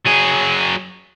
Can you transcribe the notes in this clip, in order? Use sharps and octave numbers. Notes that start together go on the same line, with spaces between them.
F#3 G#4